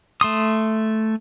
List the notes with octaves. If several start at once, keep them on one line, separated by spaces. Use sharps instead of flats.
A3 C6 D#6